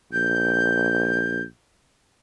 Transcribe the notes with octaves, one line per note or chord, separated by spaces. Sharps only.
A#1 G6